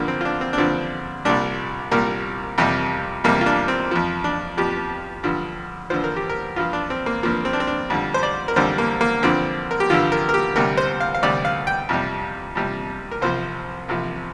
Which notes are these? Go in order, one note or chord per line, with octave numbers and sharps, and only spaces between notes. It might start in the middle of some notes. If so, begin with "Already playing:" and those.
Already playing: G2 D3 F3 A#3
C4
F4
D4
C4
D4
G2 D3 F3 C4
C2 A#2 G3 D4
C2 A#2 G3 A#4
F2 C3 G3
F2 C3 G3 A#3
F4
D4
C4
F2 F3
D4
F2 F3 G4
G2 D3 F3
G2 D3 F3 C5
A#4
G4
A#4
G2 F3 F4
D4
C4
A#3
G2 F3 A#3
C4
D4
C4
D4
F2 D3 G3
C5
D5
A#4
F2 D3 G3 C5
A#3
A#3
G2 D3 F3 C4
A#4
G4
G2 D3 F3 F4
A#4
A#4
G4
D2 C3 G3 A#4
C5
F5
F5
D2 C3 G3 D5
F5
G5
F2 C3 G3
F2 C3 G3
A#4
C2 C3 F3 C5
C2 C3 F3